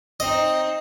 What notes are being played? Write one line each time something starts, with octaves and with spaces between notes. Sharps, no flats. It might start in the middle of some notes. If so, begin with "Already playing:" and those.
C4 D#4 D#5